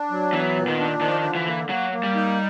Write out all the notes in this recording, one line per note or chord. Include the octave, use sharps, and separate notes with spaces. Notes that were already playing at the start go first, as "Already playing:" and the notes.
Already playing: D4
F#3
E3 B3
A#2
D#3
D4
D#3 F3
D3
E3
A#3
F#3 A#3
A#3
G3
D#4